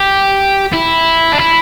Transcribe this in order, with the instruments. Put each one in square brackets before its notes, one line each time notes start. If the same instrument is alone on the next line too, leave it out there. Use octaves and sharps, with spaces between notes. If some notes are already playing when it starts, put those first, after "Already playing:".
Already playing: [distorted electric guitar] G4
E4
D4
E4